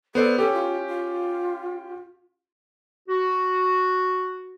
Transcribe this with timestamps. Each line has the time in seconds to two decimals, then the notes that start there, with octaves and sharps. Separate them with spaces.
0.15 B3 A4 C5 D5
0.38 C#4 G4 A4
0.53 F4
0.88 F4
3.08 F#4